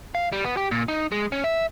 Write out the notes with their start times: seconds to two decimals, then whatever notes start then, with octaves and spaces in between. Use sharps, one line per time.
0.15 F5
0.32 G3
0.45 B3
0.57 G4
0.71 A#2
0.88 D#4
1.12 G#3
1.32 C#4
1.44 E5